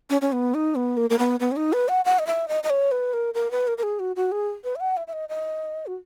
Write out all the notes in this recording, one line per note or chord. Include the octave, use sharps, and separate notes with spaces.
C#4
C#4
B3
D#4
B3
A#3
A#3
B3
B3
C#4
D#4
B4
F#5
F#5
D#5
E5
D#5
D#5
C#5
B4
A#4
A#4
B4
A#4
A#4
G#4
F#4
F#4
G#4
B4
E5
F#5
E5
E5
D#5
D#5
F#4